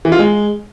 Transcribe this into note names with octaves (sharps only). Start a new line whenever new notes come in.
E3
F4
G#3